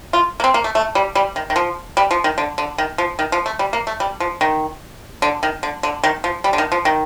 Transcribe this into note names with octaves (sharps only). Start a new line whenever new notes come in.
F4
A#3
C4
A#3
A3
A3
G3
G3
D#3
D#3
F3
G3
F3
D#3
D3
D3
D#3
F3
D#3
F3
A3
G3
A#3
A3
G3
F3
D#3
D3
D#3
D3
D3
D#3
F3
G3
D3
D#3
F3
D#3